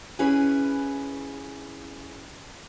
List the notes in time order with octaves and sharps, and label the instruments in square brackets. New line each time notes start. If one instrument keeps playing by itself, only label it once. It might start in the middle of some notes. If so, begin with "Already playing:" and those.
[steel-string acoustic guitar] C#4 E4 G#4 B4 G#5